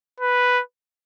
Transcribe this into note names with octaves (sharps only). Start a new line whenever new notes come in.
B4